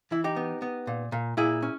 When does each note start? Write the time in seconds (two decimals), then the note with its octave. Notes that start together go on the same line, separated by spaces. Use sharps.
0.11 E3 E4
0.24 D#4 G4
0.36 B3
0.62 B3
0.87 A#2
1.12 A#2
1.37 A#2 E4 G#4
1.62 C#4